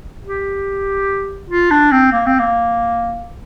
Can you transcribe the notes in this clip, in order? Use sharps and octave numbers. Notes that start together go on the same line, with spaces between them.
G4
F4
D4
C4
A#3
C4
A#3